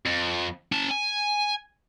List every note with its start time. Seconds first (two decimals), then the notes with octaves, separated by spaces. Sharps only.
0.06 F2
0.72 C#4 A5
0.91 G#5